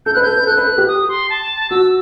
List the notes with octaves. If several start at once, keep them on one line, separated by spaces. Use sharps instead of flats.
A4 G6
B4 F#6
A4 G6
B4
A4 F#6
B4
A4
G4
D#6
C6
A5
F#4 E6